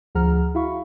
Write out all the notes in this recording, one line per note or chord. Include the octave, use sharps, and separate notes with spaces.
D2 F3 G#4 F#5 A#5 F6
E4 F#4 F5 B5 C#6